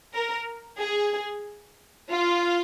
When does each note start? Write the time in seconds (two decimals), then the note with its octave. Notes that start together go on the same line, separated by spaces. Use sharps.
0.14 A#4
0.79 G#4
2.11 F4